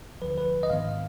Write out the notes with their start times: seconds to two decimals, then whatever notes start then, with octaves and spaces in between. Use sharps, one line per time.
0.22 D2 D3 F3 B4
0.38 B4
0.63 D#5
0.70 G#2 D#3 B3 F5